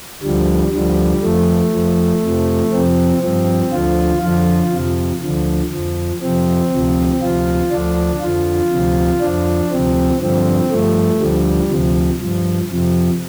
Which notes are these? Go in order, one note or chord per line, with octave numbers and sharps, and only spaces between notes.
D2 D3 F3 G3
D2 D3 F3 G3
F2 F3 A3
F2 F3
F2 C3 F3
F2 C3 F3 C4
G2 F3 C4
D2 D3 F3 F4
F2 D3 F3 F4
F2 C3 F3
D2 D3 F3
F2 F3
F2 C3 F3 C4
D2 C3 F3
D2 C3 F3 F4
D2 D3 F3 D4
F2 D3 F3 F4
D2 C3 F3
F2 F3 D4
D2 C3 F3 C4
G2 D3 F3 C4
G2 F3 A3
D2 D3 F3 G3
D2 C3 F3
G2 F3
F2 C3 F3